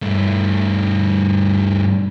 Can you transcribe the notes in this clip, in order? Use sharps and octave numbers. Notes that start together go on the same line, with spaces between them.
G2 A3